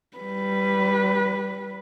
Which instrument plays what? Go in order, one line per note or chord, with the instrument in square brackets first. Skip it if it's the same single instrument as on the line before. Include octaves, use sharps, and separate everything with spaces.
[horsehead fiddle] G3 B4